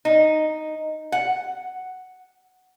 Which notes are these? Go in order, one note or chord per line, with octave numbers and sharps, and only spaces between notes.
D#4
F#5